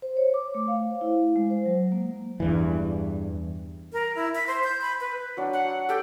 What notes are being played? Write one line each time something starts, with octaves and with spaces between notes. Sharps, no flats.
C5
C#5
D6
A3
F5
C5
E4
G#3
C5
F#3
A#3
E2 G2 E3
A#4
E4
B6
C5
G6
B5
B4
F#3 D4
F#5
G4 A4